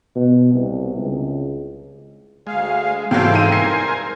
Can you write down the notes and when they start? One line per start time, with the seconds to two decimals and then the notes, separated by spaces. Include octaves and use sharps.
0.15 B2
0.54 C2
0.98 C#2
2.47 D2 G#3 F5
3.11 G#2 C3 E3 F#3 A4 C5 F5 G5
3.34 D#4 D#7
3.52 G2 A#4 C5 G#5 C7